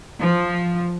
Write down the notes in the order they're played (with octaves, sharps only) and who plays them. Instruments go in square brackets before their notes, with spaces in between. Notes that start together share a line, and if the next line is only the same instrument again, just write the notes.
[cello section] F3